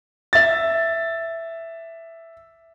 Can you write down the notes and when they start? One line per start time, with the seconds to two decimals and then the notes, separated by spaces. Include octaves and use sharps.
0.33 E5 A6